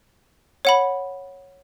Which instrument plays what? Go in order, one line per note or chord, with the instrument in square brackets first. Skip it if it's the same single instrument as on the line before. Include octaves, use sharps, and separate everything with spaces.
[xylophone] C#5 F#5 B5